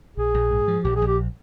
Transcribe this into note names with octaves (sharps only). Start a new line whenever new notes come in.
A#1 G#4
A#1
G#2
F3
A#1 G4
G#4
A#1
G4